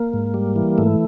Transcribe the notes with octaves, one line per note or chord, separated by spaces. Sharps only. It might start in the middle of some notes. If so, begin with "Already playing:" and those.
Already playing: A#3
G#2
G3
E3
G#2 A3